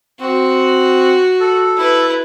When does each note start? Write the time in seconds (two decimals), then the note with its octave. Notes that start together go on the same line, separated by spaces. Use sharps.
0.20 C4 F#4
1.40 A4
1.78 E4 B4